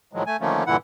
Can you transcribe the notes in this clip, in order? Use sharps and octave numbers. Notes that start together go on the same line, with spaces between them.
A2 D#3 F3 F#3 G#3
A3 G#5
D3 D#3 F3 A3 A#3 C#4
G2 A#2 D3 E3 E4 F#5